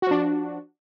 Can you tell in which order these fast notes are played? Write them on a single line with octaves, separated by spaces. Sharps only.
F#4 F3 D4